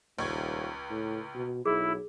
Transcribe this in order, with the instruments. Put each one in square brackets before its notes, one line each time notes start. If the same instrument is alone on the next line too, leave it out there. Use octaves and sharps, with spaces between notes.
[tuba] D#1 [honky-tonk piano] C#2 C#6 G#6
[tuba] A2
B2
[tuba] B1 [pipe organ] E4 [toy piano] G#4